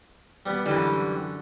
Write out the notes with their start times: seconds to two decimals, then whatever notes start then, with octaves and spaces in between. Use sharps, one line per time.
0.46 G3 B3
0.66 F#2 D3 E3 G3